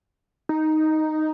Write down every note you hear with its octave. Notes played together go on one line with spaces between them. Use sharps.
D#4